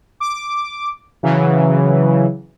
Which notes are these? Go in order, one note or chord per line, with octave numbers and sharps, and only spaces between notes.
D6
C#3 E3 F#3